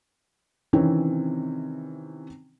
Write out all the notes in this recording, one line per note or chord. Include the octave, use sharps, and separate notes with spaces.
C3 D#3 E3 C4 C#4